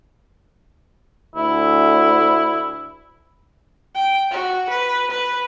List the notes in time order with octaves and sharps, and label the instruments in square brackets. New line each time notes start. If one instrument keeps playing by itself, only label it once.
[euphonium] D2 [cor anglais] E4
[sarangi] G5
F#4
B4
B4